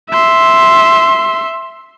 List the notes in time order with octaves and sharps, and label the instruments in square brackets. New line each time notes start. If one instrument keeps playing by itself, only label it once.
[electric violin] E5 C6